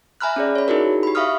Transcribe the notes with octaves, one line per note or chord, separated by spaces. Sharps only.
E5 G#5 A#5 B5 F6 F#6
C#4 G#4 D5
C#5 B5
D#4 E4 F#4 G#4 A#4
G4 B5
E5 F5 B5 C#6 D#6 F6